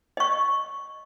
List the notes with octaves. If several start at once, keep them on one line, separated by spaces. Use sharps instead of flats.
D#5 C#6